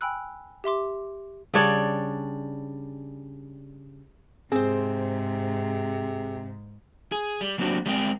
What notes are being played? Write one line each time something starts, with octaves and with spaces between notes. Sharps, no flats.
G5 G#5 B5 E6 F#6
G4 E5 C6 D6
C#3 G3 D4 C#5
G#2 C3 C4 G#4 C5
G#4
G3
F#3 A#3 C4 D4 F#4 G4
G3 G#3 C4 A#4 G5